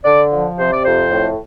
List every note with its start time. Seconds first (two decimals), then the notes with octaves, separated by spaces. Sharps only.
0.04 D3 D5
0.31 F3
0.58 C3 C5
0.71 D5
0.84 F2 C5
1.11 A2